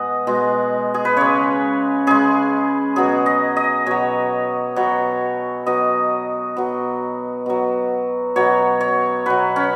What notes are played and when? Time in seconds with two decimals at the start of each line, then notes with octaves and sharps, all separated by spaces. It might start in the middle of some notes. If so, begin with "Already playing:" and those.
Already playing: B2 G#3 D#5 F#5
0.27 B2 G#3
0.94 G#4
1.05 B4
1.17 C#3 G#3 C#5
2.07 C#3 G#3 G#4
2.96 B2 F#3 G#4
3.26 D#5
3.57 D#5
3.86 B2 F#3 C#5
4.76 B2 F#3 C#5
5.66 B2 F#3 D#5
6.57 B2 F#3
7.46 B2 F#3
8.36 B2 F#3 C#5
8.81 C#5
9.26 B2 F#3 B4
9.56 C#4